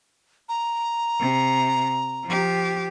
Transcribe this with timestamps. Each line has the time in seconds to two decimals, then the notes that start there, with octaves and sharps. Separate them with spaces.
0.49 A#5
1.20 C3
2.25 F3 G4